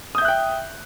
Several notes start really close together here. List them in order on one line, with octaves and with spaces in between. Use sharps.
D#6 G6 E5 F#6 G5